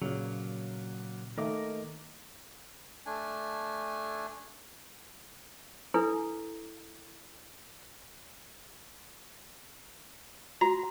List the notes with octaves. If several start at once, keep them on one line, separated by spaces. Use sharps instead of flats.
A#2 C#3 F#3 A#3
D#3 A3 A#3 A#4 D#5 D6
A3 D4 G#5
D4 E4 A4 B4
F#4 A#5